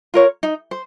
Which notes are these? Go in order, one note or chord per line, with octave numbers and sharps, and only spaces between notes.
F4 A#4 C#5
D#4
C5